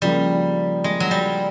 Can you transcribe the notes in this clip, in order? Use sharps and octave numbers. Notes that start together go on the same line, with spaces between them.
C#3 F3 G3 A#3
G#3
F#3
G3